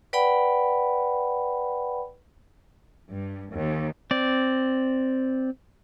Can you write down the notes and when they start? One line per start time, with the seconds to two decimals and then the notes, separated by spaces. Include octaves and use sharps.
0.13 B4 D5 F#5 G5 B5
3.11 G2
3.53 D#2
4.11 C4 D5